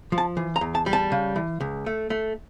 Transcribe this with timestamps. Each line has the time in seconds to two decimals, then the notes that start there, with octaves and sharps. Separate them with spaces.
0.12 F3
0.18 A5
0.37 E3
0.56 A#5
0.61 E2
0.75 A5
0.86 G3
0.93 A5
1.12 C#3
1.36 E3
1.60 C#2
1.86 A3
2.10 A3